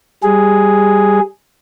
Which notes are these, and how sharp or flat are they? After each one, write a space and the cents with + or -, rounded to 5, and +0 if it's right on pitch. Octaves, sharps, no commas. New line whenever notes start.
G3 +5 G#4 +0